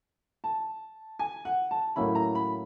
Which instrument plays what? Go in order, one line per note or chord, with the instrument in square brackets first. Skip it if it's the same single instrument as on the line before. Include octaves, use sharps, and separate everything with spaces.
[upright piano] A5
G#5
F#5
A5
[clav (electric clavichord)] A2 F#3 A#3 C#4 E4 [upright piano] B5
[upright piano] A#5
B5